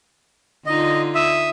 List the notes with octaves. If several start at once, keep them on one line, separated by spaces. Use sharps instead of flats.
D3 D#4 F4 D#5
E5 D#6 E6